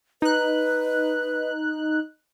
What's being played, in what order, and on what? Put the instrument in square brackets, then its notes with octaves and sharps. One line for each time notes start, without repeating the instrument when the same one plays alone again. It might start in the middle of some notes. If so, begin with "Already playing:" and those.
[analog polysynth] D#4 F#6 [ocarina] B4